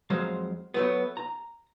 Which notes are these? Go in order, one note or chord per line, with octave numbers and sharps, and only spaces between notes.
F2 F#3 G#3 C5 F5
F#3 A3 B3
A#5